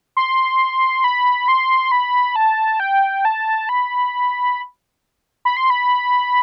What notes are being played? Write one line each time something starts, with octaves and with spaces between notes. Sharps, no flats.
C6
B5
C6
B5
A5
G5
A5
B5
B5
C6
B5